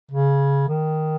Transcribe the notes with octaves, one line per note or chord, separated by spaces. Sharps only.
C#3
D#3